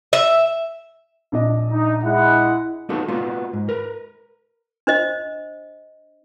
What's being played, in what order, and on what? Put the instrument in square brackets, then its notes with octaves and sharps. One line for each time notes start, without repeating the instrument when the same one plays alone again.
[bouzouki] E5
[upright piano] A#1 D4 D#5
[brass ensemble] D#4
G#3 E4 F#5
[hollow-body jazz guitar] A#3 B3 D#4 F4 F#4 A4
A#3 B3 F4 F#4
G#2
A#4 B4
[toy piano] D4 C5 D#5